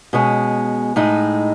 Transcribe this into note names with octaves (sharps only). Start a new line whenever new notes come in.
B2 G#3 C#4
A2 G#3 D#4